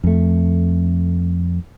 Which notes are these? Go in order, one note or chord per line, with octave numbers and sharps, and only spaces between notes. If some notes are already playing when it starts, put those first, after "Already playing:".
F2 A3